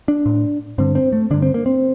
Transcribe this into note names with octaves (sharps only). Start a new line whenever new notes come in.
D4
A2
G2 D3 C4
C4
A3
G2 D3 D4
C4
A#3
C4